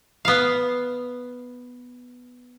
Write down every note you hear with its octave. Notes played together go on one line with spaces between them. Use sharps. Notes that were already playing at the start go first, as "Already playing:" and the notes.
B3 F5